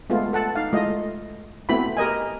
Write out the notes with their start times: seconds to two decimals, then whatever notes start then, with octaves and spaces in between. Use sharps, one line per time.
0.10 G#3 A3 B3 F4
0.33 A4 F#5 A5
0.55 D#4 F5
0.73 G#3 A3 E4 F4 D#5
1.69 A3 B3 C4 E4 F#4 B5
1.97 G4 A#4 D#5 G#5